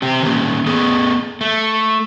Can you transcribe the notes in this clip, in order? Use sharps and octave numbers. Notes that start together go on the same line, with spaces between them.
C3 C4 G4
D#3 A#3 C#4
B3 G#4 A4
A3